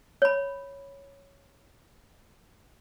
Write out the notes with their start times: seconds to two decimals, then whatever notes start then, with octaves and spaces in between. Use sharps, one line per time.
0.22 C#5 B5